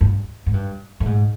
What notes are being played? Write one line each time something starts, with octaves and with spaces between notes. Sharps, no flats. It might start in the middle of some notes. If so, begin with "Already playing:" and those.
G2
G#2
G2
A2
G#2